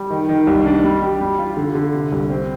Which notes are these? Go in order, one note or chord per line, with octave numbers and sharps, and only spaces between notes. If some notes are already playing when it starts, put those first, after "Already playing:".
Already playing: G3
D#3
D#3
C2
D4
G3
G4
G3
F4
D3
D3
C3
C2
C4